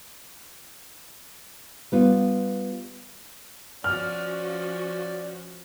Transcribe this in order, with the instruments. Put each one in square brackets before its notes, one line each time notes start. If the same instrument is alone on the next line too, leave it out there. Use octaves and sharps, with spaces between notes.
[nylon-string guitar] G3 B3 F4
[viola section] F3 C#4 F#4 [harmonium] D5 [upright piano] F6